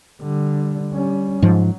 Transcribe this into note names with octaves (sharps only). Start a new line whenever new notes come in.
D3 G3
G3 C#4
G#2 F3 F#3